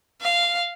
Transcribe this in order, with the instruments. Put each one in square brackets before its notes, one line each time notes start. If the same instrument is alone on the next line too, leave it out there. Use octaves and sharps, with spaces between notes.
[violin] F5